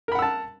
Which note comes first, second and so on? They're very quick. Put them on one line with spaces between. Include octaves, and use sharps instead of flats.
A#4 B5 F#5 E6 A5